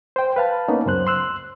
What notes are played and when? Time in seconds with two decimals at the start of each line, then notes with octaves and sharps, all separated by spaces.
0.16 C5 G5
0.36 B4 F5 A5
0.68 A#3 B3 C#4 D#4
0.86 C#2 F#2 C5 F#6
1.07 C6 E6 F#6